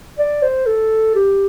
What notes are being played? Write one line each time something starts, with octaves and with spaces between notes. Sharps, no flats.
D5
C5
A4
G4